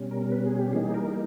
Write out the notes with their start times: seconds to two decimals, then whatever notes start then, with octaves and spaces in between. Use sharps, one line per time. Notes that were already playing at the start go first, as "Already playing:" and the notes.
Already playing: B2 G3 C#4
0.11 A#4
0.31 B4
0.45 G#4
0.59 G4
0.73 E3 G3 A#3 D#4 G#4
0.94 A#4